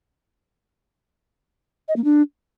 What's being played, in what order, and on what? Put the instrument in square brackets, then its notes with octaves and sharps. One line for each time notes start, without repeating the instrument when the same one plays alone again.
[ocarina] D#5
A#3
D4